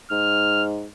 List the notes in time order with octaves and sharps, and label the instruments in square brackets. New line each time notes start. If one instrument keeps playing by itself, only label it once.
[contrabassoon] G#2 [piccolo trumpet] F6